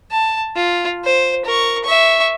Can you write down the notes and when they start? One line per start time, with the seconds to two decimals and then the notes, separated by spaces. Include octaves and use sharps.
0.11 A5
0.56 F4
1.04 C5
1.45 A#4 C#6
1.84 E5 C#6